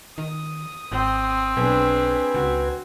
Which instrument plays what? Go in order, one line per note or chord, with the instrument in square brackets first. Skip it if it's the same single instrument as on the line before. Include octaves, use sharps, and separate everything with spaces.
[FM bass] D#3 [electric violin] D#6
[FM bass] G#1 [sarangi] C4
[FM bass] B1 [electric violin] D4 G#4 [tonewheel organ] B4 G#5
[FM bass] C#2 [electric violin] F#4